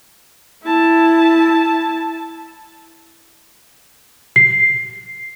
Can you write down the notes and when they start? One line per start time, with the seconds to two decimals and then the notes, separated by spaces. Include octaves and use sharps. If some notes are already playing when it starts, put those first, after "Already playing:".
0.63 E4 A5
4.36 C7